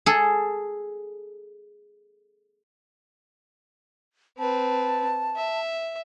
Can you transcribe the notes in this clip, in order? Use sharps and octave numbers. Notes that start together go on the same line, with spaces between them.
G#4 A4
C4 B4 A5
E5